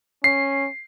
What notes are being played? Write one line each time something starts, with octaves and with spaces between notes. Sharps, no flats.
C#4 C7